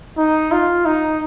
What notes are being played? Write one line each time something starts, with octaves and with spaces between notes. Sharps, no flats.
D#4
F4
D#4